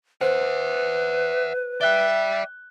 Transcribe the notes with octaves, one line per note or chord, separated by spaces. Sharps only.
B4 C5 E5 F#5
D5 E5 G5 F#6 G7